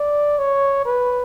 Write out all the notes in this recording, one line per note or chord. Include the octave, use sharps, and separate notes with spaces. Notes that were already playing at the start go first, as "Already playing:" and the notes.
Already playing: D5
C#5
B4